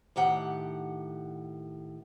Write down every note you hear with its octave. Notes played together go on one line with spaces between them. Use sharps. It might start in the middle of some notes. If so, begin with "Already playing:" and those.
A2 D#3 G4 F#5